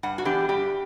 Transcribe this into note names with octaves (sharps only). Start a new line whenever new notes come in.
G2 F#5
F#4
E3 B3 D4 G4
G2 G4